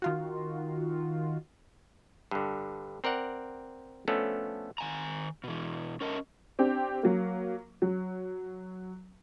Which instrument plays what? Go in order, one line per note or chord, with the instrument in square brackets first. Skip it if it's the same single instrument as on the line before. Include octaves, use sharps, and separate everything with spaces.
[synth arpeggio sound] D#3 F4 F#4
[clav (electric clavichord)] G2 D3
C4 A#4 D5 F#5
F3 A3 B3 C#4 D4 A4
[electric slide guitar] D#3 G#5 A#5
B2 E3
C#4 A#4 D#5 A5
[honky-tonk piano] C4 D4 G4
F#3 A#3
F#3